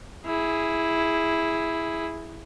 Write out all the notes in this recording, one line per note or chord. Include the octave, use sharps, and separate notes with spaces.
E4 G#4